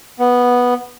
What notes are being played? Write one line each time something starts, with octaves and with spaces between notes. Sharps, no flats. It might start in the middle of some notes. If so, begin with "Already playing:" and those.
B3